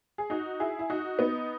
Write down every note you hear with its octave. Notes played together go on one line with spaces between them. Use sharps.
G#4
D#4 F#4
E4 G#4
E4
D#4 F#4
B3 D#4